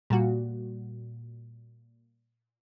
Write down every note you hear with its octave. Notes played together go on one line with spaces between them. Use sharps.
A#2 G3 F#4